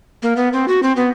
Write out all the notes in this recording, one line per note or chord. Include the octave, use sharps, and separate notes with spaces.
A#3
B3
C4
F#4
C4
B3